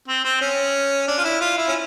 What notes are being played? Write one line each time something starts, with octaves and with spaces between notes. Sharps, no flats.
C4
C4
C#4
D4
F4
E4
F4
E4
C#4